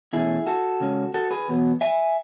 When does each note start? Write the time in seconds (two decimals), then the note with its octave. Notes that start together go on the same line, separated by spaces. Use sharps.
0.13 E2 B2 A3 C#4 E4 G#4
0.46 F#4 A4
0.80 C#3 G#3 C#4
1.14 F#4 A4
1.31 G#4 B4
1.48 E2 B2 F#3 B3
1.81 E5 G#5